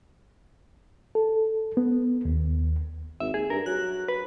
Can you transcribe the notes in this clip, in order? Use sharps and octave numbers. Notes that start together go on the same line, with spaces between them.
A4
B3
D#2
G#1 E5
D#2 G#4
G2 A#4
F#3 F#6
B4